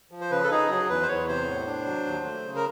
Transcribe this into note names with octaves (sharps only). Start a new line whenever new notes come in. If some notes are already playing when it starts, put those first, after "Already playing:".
F3
C5
C#3 B4
A4
D#4 G#4
F#3 G#4
E2 B4
C5
E2 C#5
C3 C5
A2
D4
F#3
D#2
A3
C#3
A#4